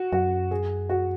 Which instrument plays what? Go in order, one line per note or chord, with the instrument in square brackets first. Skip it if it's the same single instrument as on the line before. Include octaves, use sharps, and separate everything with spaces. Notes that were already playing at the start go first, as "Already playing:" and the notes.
Already playing: [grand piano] F#4
[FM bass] F#2 [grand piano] F#4
[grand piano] G#4
F#4